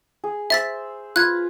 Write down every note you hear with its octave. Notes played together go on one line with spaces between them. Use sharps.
G#4
C5 E5 E6 A6 B6
F4 B4 F#6 G#6